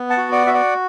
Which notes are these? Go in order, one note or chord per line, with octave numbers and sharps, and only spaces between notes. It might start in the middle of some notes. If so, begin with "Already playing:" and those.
Already playing: B3
F#5 A5
F#4
D5 F#5
F#4 E5
D5 F#5